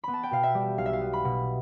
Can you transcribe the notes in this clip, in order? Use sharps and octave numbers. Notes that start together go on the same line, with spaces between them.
B3 B5
A5
G5
B2 F5
E5
G3
B1 F5
E5
F5
B3
B5
B2